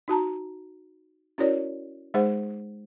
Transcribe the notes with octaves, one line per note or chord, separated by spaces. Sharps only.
D#4 F#4 A5 A#5
C#4 E4 F#4 A#4 C#5 D5
G#3 D#4 G#4 C5 F#5